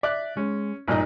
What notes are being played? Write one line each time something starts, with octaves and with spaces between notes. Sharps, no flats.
D5 E5 F#6
G#3 C#4
A1 G2 A#2 D#4